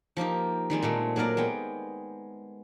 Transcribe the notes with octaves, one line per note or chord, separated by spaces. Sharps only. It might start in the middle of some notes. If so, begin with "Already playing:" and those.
F3 A#3 D#4 G4
D#3 G3 G#3 C4
A#2 G#3 A3
F#3 A#3 D#4 A#4 D5
G#3 B3 G5